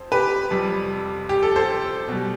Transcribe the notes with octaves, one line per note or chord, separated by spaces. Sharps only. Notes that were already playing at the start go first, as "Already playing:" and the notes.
Already playing: F2 C5
G4 B4
F2 C3 G3
G4
A4
A4 C5
B2 G3